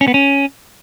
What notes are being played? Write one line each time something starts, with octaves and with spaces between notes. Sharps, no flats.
C#4
B3
C#4